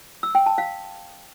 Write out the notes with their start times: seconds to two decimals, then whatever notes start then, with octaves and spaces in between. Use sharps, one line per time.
0.23 E6
0.35 G5
0.46 A5
0.58 F5